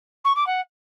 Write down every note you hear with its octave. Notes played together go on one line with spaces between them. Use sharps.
C#6
D6
F#5